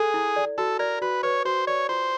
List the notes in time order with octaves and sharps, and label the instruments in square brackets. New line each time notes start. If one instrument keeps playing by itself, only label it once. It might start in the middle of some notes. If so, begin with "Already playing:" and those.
Already playing: [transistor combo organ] G#4 [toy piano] A4
[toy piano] E4
D5
[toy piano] F#4 [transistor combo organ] A4
[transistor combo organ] A#4 [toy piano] D5
[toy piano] F#4 [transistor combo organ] B4
[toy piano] B4 [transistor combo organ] C#5
[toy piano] F#4 [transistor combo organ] C5
[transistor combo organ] C#5 [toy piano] D5
[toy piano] F4 [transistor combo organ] C5